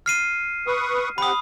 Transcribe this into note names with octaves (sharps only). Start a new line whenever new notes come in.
F6 C7 D#7
B4 C#6 D#6
C4 G4 F#5 B5 D#6